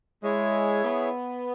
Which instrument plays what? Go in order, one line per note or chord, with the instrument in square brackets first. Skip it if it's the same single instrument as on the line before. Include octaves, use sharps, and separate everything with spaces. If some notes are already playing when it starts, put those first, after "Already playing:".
[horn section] G#3 [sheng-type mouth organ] E4 G#4 C#5 E5
[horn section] B3